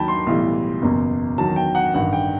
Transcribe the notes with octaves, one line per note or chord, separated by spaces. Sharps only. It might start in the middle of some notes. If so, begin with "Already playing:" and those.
Already playing: D#2 D#3 F#3 G5 A5 B5
C6
B1 A2 E3 G3
F#1 E2 B2
E2 D#3 F#3 A5
G5
F#5
A1 G2 D#3 F#5
G5